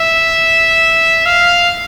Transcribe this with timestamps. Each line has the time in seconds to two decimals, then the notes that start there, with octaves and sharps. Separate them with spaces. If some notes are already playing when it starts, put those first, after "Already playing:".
Already playing: E5
1.26 F5